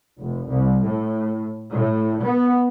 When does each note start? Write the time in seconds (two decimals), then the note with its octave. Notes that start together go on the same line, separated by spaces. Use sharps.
0.20 F1
0.49 C2
0.85 A2
1.73 A2
2.24 B3